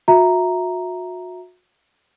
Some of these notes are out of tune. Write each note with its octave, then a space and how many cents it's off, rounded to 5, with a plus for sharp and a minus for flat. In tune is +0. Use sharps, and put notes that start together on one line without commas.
F#4 -35 E5 +0 A#5 +0